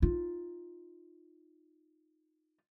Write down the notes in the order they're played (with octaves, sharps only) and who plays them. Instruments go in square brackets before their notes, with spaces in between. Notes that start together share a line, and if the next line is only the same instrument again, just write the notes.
[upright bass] D#4 F4